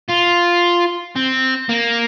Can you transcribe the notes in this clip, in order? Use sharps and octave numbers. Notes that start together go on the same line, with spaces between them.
F4
C4
A#3